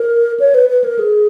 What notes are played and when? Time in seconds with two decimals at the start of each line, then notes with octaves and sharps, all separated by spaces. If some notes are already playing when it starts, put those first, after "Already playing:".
Already playing: A#4
0.40 C#5
0.55 B4
0.69 B4
0.84 A#4
0.99 G#4